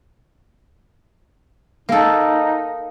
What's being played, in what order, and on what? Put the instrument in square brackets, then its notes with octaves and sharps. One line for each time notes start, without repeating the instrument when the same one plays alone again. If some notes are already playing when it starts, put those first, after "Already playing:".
[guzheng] A#3 A4 [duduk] D#4